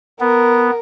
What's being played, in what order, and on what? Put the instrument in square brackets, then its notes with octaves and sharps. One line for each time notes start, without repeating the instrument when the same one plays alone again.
[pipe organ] B3 [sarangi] A#4